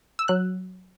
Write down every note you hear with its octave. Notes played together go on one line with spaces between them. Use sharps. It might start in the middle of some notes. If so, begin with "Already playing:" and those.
E6
F#3 F#6